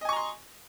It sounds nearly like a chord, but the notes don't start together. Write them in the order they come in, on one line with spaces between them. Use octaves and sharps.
D#5 G#5 C#6 A#5 C6